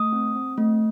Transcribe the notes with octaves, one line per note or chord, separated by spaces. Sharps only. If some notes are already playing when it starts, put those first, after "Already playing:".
Already playing: A3 D#6
C4
C4
A3